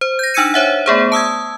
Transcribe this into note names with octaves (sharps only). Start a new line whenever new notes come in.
C5
G6 A#6
D4 D#4 E6 G#6 C#7 D#7
C5 C#5 E5 F#5
A3 B3 G#4 C5
A5 D#6 E6 G#6